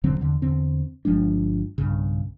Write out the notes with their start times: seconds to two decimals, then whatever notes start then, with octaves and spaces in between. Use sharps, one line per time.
0.04 E1 D3 F#3 C4
0.21 E2 D3
0.42 E2 D3 C4
1.05 G1 F3 G#3 D4
1.78 B1 G2 C#3